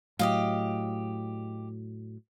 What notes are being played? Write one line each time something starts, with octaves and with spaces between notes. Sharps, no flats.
A2 F#3 G4 D#5 F5